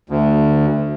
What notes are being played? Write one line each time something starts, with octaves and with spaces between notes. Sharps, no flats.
D2